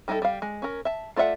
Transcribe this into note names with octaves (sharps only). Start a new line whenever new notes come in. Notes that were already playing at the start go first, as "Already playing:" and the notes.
G3 D#4 E4 G#4 A4
G3 F5
G#3
C#4 A#4
E5 A5
A3 F4 D5 E5 F#5